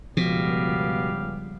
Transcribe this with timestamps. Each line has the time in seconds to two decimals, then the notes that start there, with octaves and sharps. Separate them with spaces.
0.17 G1 C#2 B2 F3 B3 G4 F5